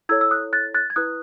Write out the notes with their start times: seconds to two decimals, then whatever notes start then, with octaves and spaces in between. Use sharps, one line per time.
0.09 E4 A4 C#5 E6 G#6
0.21 E6
0.31 D#6 F#6
0.53 F#6 A6
0.74 F#6 A6
0.90 G#6
0.96 E4 B4 D#6 F#6